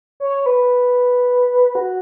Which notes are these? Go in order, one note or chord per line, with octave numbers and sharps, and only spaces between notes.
C#5
B4
F#4